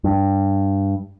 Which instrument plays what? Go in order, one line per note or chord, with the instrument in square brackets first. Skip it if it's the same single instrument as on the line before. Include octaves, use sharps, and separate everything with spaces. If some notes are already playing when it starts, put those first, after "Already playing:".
[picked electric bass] G2